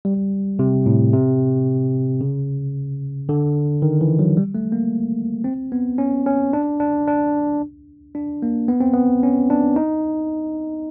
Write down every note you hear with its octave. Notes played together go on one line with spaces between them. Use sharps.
G3
C3
A2
C3
C#3
D3
D#3
E3
F#3
G3
A3
A#3
C4
B3
C#4
C#4
D4
D4
D4
D4
A#3
B3
C4
B3
C#4
D4
D#4